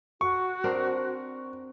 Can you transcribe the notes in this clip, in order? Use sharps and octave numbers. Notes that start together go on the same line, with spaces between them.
F#4 C#6
C4 D4 A#4